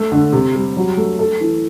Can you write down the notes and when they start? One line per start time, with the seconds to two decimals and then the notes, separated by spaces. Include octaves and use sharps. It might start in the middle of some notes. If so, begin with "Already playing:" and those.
Already playing: A3
0.12 D3
0.33 C3
0.54 G3
0.76 F#3
0.97 A3
1.19 A4
1.41 E3